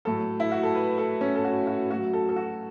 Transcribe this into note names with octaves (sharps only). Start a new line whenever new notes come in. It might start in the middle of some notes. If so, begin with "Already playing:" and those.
A2 F#3 A4
E4
F#4
A4
B4
A4
C#4
A4
F#4
F#4
A2 F#3 F#4
A4
A4
F#4